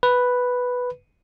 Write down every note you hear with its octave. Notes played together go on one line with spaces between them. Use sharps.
B4